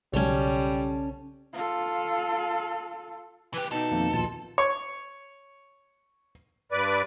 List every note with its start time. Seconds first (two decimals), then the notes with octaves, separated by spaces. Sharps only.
0.13 B1 C#3 F#3 G3 C#4 A4 C#5
1.53 F4 A4
3.54 E3 G4 B4
3.72 B2 D#4 A4 E5
3.91 F2 D#3 A#3
4.13 A#1 D#2 F4 A5
4.58 C#5
6.72 G2 B4 D5